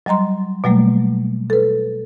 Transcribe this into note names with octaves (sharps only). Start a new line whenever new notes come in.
F#3 G3 D#5 A#5 C6
B2 F#3 G3 A3 A#3
A4 B4